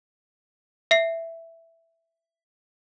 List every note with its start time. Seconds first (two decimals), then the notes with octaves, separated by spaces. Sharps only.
0.91 E5 C7